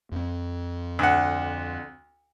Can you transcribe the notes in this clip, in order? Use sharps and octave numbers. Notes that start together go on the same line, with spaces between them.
F2 C4
D2 F#5